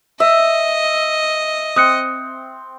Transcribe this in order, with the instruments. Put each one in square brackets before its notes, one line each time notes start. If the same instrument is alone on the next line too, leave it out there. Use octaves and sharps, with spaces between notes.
[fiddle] D#5 [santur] E5
[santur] C4 [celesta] D#6 F#6 C#7